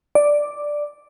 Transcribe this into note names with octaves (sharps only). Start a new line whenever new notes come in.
D5